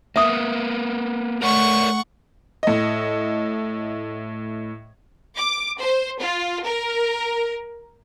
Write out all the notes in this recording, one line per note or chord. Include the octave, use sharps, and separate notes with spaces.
A#3 B3 E5 D#6
A3 A#4 C#5 D5 F#5 C#6
A2 D#5
D6
C5
F4
A#4